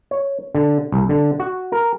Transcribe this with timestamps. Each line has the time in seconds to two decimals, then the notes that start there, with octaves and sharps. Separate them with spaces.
0.11 C#5
0.55 D3
0.92 C2
1.09 D3
1.40 F#4
1.72 A#4